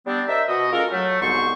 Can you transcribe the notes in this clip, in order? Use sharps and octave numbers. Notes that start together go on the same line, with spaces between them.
G3 B3 C4 D4
D4 A#4 C5 D#5 E5
B2 F#4 D#5
G#3 A#3 C#4 F4 A4 A#4
F#3 A3
C2 G#2 B3 F#4 C5 C#6